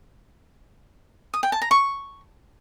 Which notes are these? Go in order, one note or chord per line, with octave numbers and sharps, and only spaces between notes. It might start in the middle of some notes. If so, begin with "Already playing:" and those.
D#6
G5
A5
A#5
C#6